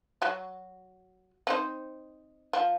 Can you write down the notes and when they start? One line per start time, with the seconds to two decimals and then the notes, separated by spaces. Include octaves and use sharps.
0.22 F#3 F#4
1.47 C4 D#4 C5
2.53 F3